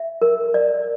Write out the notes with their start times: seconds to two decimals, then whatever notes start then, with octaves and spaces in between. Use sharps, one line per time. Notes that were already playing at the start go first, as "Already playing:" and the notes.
Already playing: E5
0.22 A#4
0.54 D5